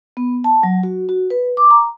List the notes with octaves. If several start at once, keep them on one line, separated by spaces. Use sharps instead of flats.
B3
A5
F#3
F#4
F#4
B4
D6
A#5